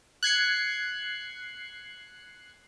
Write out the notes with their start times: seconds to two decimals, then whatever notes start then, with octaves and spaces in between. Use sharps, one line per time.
0.23 F#6 G#6 C7 C#7